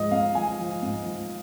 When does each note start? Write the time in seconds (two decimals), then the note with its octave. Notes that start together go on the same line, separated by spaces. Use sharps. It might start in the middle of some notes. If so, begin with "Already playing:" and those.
Already playing: G#2 F3 G#3 D#5
0.11 G#2 F5
0.35 F3 G#5
0.59 F3
0.83 G#2
1.05 F3